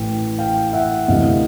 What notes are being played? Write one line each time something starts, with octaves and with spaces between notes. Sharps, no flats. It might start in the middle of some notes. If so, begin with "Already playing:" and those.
Already playing: A1 A2 E3 G5
F5 G5
E5 F#5
D2 C3 E3 D#5 F5